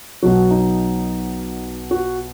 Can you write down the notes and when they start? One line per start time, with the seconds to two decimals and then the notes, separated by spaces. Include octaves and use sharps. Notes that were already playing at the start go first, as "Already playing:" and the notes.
0.23 B1 B2 F#3 F#4
0.51 D#4
1.91 F#4